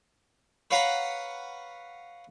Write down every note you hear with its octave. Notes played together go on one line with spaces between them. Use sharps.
B4 C#5 F5 F#5 A#5 B5